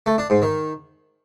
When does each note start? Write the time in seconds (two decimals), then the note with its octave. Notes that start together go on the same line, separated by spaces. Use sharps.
0.06 A3
0.18 D4
0.30 G#2
0.42 D#3